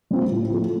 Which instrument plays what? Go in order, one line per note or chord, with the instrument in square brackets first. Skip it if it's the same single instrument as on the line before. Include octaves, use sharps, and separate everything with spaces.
[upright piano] G3 C4 F4
A2
F3 A3